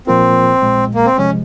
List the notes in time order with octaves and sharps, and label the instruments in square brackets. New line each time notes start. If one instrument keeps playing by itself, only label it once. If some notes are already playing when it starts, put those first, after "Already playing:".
[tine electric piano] A#2 F3 A#3 F4 A#4 [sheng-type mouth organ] C4
[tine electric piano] A#1 A#2 G#3
[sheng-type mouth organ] A#3
C4
[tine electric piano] C3 F3 G#3 [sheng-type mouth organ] C#4